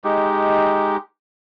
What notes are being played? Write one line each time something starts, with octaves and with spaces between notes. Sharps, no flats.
G#3 D#4 G4